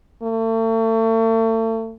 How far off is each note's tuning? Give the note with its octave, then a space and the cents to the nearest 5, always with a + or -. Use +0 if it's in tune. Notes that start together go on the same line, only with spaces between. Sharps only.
A3 +35